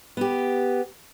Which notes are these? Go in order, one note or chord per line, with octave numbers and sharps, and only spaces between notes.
B3 G4